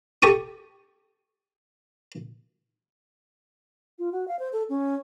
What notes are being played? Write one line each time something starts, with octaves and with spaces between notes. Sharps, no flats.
G4 A4 C#6 D#6
F4
F#4
F5
C5
A4
C#4